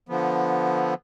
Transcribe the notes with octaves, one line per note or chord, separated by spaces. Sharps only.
D3 F3 B3